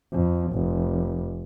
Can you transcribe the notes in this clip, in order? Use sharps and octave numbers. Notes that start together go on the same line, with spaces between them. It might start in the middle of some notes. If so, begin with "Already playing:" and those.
F2
F1